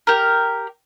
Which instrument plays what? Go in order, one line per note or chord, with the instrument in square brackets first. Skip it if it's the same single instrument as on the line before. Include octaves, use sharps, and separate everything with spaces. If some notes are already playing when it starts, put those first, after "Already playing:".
[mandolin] G4 A#4